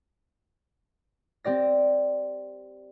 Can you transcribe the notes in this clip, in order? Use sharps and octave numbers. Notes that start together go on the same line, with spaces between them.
C4 G4 D5 A#6